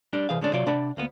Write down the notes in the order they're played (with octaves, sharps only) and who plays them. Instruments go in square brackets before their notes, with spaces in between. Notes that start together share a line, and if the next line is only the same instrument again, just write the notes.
[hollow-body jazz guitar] G3 D4 A#4
C2 E3 G#4 F5
D3 G#3 C#4 D4
C3 F#3 F4 C#5 D5
C3 D4 D5 F#5 B5
D2 A#3 B3